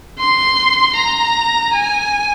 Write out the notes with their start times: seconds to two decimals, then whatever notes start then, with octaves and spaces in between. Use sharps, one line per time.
0.19 C6
0.96 A#5
1.73 G#5